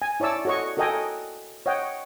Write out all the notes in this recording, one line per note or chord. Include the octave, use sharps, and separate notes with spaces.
G#5
E4 C#5 D5 A5 E6
F#4 A4 C#5 D#5 C#6
F#4 A4 A#4 D#5 G5 G#5
C#5 D#5 F#5 G5